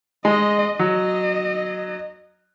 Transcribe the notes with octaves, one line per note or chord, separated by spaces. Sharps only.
G#3 D#5
F#3 D#5